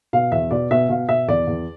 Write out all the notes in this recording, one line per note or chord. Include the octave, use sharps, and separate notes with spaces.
B2 F5
E2 E5
B2 D5
B2 E5
B2 F5
B2 E5
E2 D5
E2